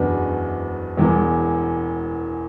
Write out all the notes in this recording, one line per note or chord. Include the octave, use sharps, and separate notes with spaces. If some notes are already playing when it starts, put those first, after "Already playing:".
Already playing: F#1 E2 B2 B3 D4
E1 E2 E3